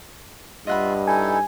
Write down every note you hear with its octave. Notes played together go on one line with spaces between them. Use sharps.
G2 F4 D#5 E5 F#5 B5
D#4 E4 A4 G#5